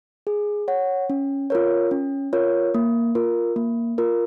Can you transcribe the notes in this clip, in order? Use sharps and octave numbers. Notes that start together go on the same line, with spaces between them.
G#4
C#5 F#5
C#4
F4 A#4 C#5
C#4
F4 A#4 C#5
A#3
F4 A#4
A#3
F4 A#4